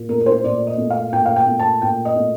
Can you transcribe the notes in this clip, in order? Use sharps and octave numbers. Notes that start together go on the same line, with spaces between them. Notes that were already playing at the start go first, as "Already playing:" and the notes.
Already playing: A#2
A3 A#4
A#4
C5
A#2 D5
D#5
A3
F5
A#2 G5
F5
G5
A3
A5
A#2 G5
D#5
A3